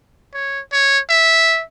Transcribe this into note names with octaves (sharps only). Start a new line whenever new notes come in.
C#5
C#5
E5